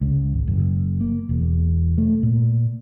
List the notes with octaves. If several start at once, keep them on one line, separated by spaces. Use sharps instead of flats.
C#2
G#1
F#1
A#3
E1
A3
A#2